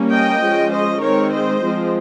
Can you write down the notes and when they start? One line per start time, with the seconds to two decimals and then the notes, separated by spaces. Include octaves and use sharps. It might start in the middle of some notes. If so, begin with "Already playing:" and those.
Already playing: G3 A#3 C#4
0.12 D#5 G5
0.42 F3 G#3 C#4
0.73 C5 D#5
1.03 D#3 G#3 C4 A#4 C#5
1.33 C5 D#5
1.64 F3 G#3 C4